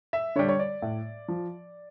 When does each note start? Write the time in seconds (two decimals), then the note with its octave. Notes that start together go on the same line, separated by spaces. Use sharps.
0.13 E5
0.35 D3 G3 C#5
0.49 C#5
0.59 D5
0.82 A2
1.28 F3